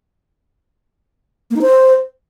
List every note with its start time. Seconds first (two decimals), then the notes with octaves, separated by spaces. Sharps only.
1.51 A#3
1.56 D#4
1.62 C5